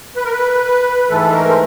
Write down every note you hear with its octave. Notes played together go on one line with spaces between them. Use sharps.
B4
A#4
B4
G#2 E3 A3 A4
A#4
C5